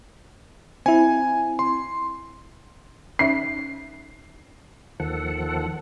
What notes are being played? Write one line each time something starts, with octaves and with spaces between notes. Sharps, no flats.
C4 E4 G#5
C6
C#4 D#4 E5 C7
D#2 D#3 F3 A4 F#5